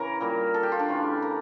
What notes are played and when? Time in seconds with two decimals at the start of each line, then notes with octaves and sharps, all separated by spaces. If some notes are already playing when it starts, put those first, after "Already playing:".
Already playing: C#3 E3 A#4 C#5
0.20 A#2 G3 A#3
0.54 A4
0.63 G4
0.72 F4
0.79 D4
0.89 C#3 E3 A3
1.22 A#4